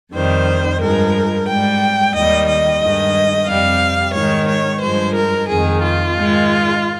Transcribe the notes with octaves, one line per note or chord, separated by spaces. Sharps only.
F2 D#3 G3 C5
G2 F3 G#3 A#4
G#2 G3 G5
D#2 D#3 G3 D#5
D#5
G2 D#3 G#3
F2 C3 G3 F5
G#2 D#3 G#3 C#5
C#5
G2 F3 G#3 C5
A#4
F2 D#3 G#3 G#4
F4
G#2 D#3 G#3